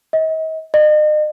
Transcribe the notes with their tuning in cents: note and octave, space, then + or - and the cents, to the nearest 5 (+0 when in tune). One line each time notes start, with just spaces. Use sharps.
D#5 +40
D#5 -40